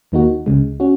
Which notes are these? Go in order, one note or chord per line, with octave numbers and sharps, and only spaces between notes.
D#2 D#3 A#3 D#4 F#4
C#2 C#3 G#3
C#4 F#4